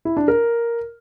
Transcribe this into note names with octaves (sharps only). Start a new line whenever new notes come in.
E4
D4
A#4